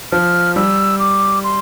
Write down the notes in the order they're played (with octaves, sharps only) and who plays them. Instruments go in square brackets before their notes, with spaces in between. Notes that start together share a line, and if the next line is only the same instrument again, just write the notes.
[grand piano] F3 [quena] F6
[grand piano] G3 [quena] E6
[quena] D6
C6